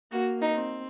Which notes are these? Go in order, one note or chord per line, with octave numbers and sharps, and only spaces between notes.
A#3 F#4
D#4
C4